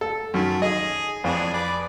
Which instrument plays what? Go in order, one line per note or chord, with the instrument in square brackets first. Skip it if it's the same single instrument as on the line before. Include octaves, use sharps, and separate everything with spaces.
[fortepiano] A4
[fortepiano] F#2 D#3 [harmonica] A3
[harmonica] G#4 [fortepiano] D#5
[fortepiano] F2 [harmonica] E3 D4 G#4
[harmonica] B4 D5